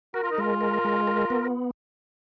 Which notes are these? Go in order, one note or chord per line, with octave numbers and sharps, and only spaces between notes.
F#4 A#4
F4
D#4
G#3 F4
A#4
G#3
A#4
B3